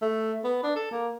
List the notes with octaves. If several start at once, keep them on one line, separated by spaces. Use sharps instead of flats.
A3
B3
D4
A4
A#3